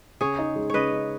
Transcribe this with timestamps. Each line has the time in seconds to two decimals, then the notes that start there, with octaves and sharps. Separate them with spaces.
0.21 C#3 G#4 C#5
0.39 D#4
0.56 G#3
0.70 C#3 B4 C#5 D#5
0.92 C#3